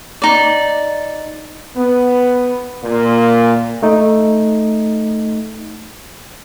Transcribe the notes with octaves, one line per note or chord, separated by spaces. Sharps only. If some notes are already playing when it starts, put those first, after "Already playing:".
D#4 D5
B3
A#2
A3 D#4